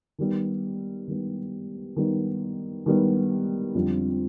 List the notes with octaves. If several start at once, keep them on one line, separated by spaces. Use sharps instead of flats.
D#3 G3 B3
D#3 G3 B3
D#3 G3 B3
D#3 G3 B3
F2 D3 G3 C4 F4